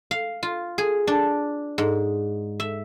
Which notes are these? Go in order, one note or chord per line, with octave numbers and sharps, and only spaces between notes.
F5
F4
G#4
D4
G#2
E5